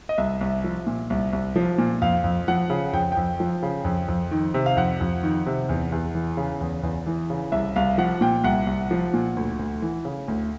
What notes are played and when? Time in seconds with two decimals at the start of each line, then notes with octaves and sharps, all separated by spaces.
0.09 D#5
0.18 C2 E5
0.41 C2
0.64 F3
0.87 A#2
1.10 C2
1.33 C2
1.56 F3
1.78 A#2
2.02 F2 F5
2.24 F2
2.48 F3 F#5
2.70 C#3
2.93 F2 G5
3.12 F2 G5
3.40 F3
3.63 C#3
3.85 F2
4.08 F2
4.31 D#3
4.54 C3
4.66 F5
4.77 F2 F#5
5.01 F2
5.23 D#3
5.46 C3
5.69 E2
5.92 E2
6.15 E3
6.37 C#3
6.61 E2
6.83 E2
7.07 E3
7.30 C#3
7.52 C2 E5
7.76 C2 F5
7.98 F3 F#5
8.21 A#2 G5
8.44 C2 F#5
8.67 C2
8.91 F3
9.13 A#2
9.37 D2
9.59 D2
9.82 E3
10.05 C#3
10.28 D2